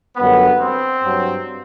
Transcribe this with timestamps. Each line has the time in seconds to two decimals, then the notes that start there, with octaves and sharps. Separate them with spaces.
0.16 F#2 D3 G3 B3
0.60 C4
1.04 G2 F#3